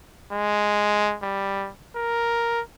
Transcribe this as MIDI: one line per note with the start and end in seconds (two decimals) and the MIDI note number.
0.33 1.16 56
1.23 1.69 55
1.96 2.61 70